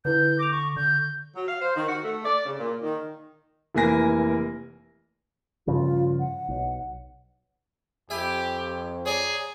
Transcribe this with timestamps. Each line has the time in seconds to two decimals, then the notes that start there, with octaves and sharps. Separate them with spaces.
0.05 D3 E4 B4 G6
0.39 D6 A#6 F7
0.52 C#6
0.76 D3 G6
1.34 F#3
1.48 F5
1.61 C5
1.75 D#3
1.89 F#4
2.03 A3
2.25 D5
2.45 C#3
2.60 A#2
2.83 D#3
3.75 F1 E3 A#3 G#5 A#6
5.67 G2 C#3 F3 F4
6.20 F#5
6.48 B1
8.10 F2 G4 E5 G#5 B5
9.06 G#4 C#5 D5 A#5